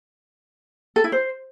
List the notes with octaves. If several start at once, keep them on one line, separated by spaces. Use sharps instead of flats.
A4
E4
C5